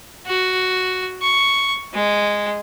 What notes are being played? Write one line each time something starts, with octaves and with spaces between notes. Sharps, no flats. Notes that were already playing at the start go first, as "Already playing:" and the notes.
F#4
C#6
G#3